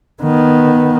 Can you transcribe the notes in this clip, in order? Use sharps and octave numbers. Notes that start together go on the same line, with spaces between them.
D#3 B3